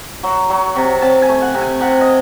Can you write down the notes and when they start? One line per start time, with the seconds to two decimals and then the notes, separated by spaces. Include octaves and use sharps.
0.23 F#3
0.50 F#3
0.76 C3
1.02 C3 A5
1.22 G#5
1.29 A3
1.41 F#5
1.55 C3
1.62 G#5
1.81 C3 F#5
2.01 D#5